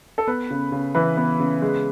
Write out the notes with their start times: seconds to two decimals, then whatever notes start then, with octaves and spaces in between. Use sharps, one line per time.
0.18 A4
0.27 B3 B4
0.51 C#3
0.72 C#3
0.95 E3 B4
1.17 B3
1.40 C#3
1.62 G#3